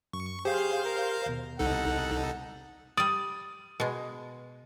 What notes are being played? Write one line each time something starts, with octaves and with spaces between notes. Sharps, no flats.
F#2 C#6
G4 G#4 C5 F5 G6
A#4
D#2 B2
C2 D#4 A4 F#5
G3 D5 D#6
B2 G#3